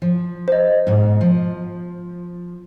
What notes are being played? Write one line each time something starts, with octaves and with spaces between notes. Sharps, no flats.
F3
C5 D#5
G#2 B2
F3